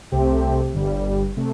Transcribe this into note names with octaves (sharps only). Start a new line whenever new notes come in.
C2 C3 A3 C4 G4
G1 G2 G3
C3 A3